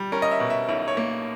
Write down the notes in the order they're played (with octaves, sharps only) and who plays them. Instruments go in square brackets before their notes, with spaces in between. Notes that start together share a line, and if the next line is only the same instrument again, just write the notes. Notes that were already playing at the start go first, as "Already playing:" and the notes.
Already playing: [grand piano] G3
C#4 A#4
D#5
E5
B2
E5
B1 E5
C#5
A#3